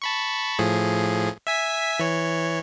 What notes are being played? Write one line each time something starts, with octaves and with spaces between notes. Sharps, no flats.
A5 B5 C#6
A2 F3 G#4
E5 G#5 B6
E3 C#5